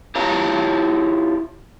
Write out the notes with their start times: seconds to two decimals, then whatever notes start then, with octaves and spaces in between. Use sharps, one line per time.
0.15 E4 F4 G4 C#5 A5 A#5